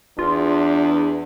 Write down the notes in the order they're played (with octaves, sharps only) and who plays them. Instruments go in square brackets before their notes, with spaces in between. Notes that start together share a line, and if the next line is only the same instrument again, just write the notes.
[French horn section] E2 D4 [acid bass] F4